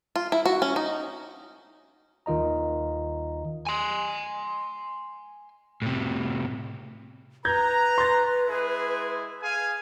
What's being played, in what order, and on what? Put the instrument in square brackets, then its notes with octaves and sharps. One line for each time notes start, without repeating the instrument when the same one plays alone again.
[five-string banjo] F4
E4
F#4
C#4
D#4
[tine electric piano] D#2 D#3 F4 D#5 A#5
[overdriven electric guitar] G#5 C6
A2 C3
[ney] B4 [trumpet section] A#5 [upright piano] G6 G#6
[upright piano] C6 A6
[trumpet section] G#3 E4 G#4
G#4 F5 G#5